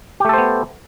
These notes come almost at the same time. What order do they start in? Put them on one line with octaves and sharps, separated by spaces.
G4 A3 A4 C5 B3